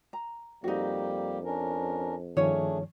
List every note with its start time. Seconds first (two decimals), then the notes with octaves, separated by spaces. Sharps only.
0.13 A#5
0.64 F2 G3 A#3 D#4 F#4 G4
1.44 C#4 D4 A#4
2.37 G2 D#3 F3 A3 C#4 D4 G#4 C#5